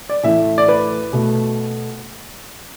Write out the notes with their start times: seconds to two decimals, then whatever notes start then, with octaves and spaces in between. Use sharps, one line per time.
0.09 D5
0.23 A2 E3 A3 E5
0.58 D5
0.68 B4
1.13 B2 A3